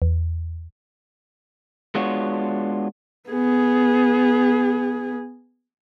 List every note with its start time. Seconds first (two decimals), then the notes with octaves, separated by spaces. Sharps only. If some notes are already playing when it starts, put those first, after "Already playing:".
0.02 E2
1.95 G#3 B3 D4 F4 F#4 C#5
3.29 B3 G#4